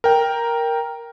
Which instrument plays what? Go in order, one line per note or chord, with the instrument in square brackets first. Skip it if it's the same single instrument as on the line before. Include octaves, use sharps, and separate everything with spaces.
[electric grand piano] A#4 G5